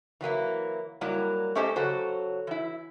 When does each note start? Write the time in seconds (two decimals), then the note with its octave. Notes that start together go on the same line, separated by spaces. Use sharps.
0.21 E3 F#3 A#3 E4
1.01 F#3 G3 A#3 E4
1.55 A3 C#4 G4 A4 C5 D#5
1.76 C#3 F#3 F#4 A4 C5
2.47 E3 E4